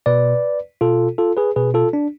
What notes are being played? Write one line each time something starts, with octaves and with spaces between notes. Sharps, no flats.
B2 B4 D5
B2 F4 A4
F4 A4
G#4 B4
B2 G#4 B4
F4 A4
D4